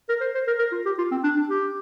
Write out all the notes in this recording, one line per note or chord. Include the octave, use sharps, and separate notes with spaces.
A#4
C5
C5
A#4
A#4
F4
G4
F4
C4
D4
D4
G4